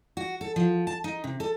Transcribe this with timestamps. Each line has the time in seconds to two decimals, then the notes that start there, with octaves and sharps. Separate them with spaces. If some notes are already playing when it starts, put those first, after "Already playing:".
0.17 F#4
0.41 A4
0.56 F3
0.87 A5
1.04 D#4
1.24 C3
1.40 A4